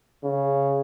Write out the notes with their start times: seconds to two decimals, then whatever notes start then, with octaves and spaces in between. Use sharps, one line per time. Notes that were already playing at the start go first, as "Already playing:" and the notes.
0.24 C#3